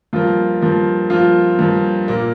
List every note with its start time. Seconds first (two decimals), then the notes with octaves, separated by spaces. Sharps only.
0.13 G2 F3 A#3 F4
0.61 G2 F3 A#3
1.10 G2 F3 A#3 F4
1.59 G2 F3 A#3
2.08 A#2 A#3